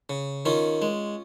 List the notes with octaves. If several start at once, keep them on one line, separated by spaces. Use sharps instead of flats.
C#3
D#3 C#4 F4
G#3